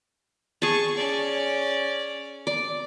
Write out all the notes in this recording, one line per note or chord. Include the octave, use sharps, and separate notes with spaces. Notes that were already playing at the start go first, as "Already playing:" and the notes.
G#4 A5 C#6
C#4 D5
D5